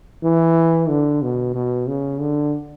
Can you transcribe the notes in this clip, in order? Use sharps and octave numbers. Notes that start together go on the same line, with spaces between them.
E3
D3
B2
B2
C#3
D3